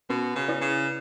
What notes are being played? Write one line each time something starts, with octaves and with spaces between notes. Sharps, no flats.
B2 C#4
C#3
E4 B4 D5
C#3